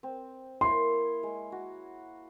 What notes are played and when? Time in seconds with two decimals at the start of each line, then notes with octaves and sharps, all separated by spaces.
0.03 C4
0.61 A#3 E4 C#5 C6
1.23 G#3
1.52 F#4